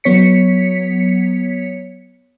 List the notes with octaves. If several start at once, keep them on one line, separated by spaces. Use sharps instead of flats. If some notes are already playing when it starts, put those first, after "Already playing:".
F#3 B3 C#5 B6 C#7